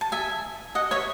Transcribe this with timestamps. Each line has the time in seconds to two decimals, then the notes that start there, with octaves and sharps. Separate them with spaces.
0.01 A5
0.12 E5 G#5
0.75 D#5 F#5
0.91 C#5 E5